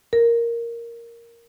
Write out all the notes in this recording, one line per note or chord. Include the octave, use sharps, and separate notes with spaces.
A#4